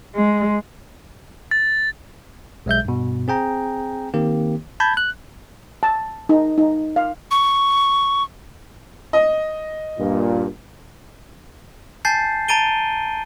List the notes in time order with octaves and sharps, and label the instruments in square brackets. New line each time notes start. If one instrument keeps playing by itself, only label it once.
[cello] G#3
[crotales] A6
[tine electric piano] B1 G#3 E5 G6
G2 B2
C4 G#4 G5 A#5
D#3 A#3 C4 G4
A5 B5 G6 G#6
F#6
[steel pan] A5
D#4
D#4
F5
[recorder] C#6
[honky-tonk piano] D#5
[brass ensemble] G2 A#2
[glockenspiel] G#5 A5 G6 A6 C7
A5 A#5 A6 D7 D#7 G7